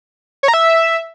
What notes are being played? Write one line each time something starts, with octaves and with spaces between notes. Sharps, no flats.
C#5
A#5
E5